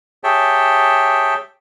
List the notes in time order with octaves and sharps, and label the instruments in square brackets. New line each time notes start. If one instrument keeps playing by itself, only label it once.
[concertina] G4 G#4 C#5 E5 G5 A5